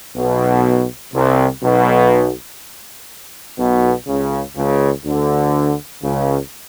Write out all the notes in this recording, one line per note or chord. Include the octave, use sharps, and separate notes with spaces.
B1 B2
C2 C3
B1 B2
B1 B2
C#2 C#3
C#2 C#3
D2 D3
C#2 C#3